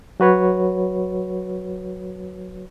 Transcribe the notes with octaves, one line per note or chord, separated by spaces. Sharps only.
F#3 F#4 B4 C#5